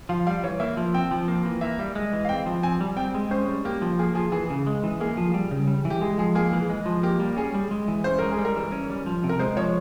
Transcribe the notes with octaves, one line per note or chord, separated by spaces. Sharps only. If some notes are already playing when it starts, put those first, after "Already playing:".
F3 F5
G3 F5
E3 C#5
A#3 E5
F3
C4 G5
F3
A#3
E3
A#3 E5
G3
G#3
E3
F5
C4 G5
F3
C4 G#5
G3
C4 G5
G#3
C#4 C5
G3
A#3 G4
F3
A#3 G#4
F3 G#4
E3 G#4
C#3
G#3
E3
A#3 G#4
F3
G3
C#3
G3
E3
G4
G#3 G#4
F3 G#4
A#3 G#4
E3
G#3
F3
A#3 G4
G3
C#4 G#4
G3
G#3
E3
C#4 C5
G#3 A#4
G#4
G3
A#4
E3
C#4
G3
F3
C3
A#4
G#3 C5
F3 C#5